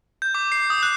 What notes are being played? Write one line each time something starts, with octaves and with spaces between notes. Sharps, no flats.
G6
D6
C7
D#6
F#6